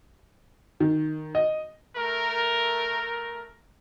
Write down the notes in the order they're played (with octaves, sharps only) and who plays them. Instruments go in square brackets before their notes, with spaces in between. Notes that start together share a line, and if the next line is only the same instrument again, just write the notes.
[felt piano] D#3
D#5
[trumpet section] A3 A#4